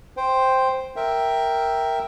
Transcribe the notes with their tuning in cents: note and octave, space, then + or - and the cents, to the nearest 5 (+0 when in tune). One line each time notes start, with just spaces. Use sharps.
C5 +0 G5 +0
A#4 +0 E5 +0 G5 +0